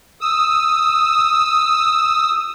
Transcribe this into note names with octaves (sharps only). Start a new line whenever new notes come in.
D#6 E6